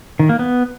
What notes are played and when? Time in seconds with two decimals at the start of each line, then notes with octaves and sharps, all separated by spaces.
0.20 D#3
0.29 A#3
0.39 B3